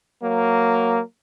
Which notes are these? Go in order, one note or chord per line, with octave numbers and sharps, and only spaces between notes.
F#3 A#3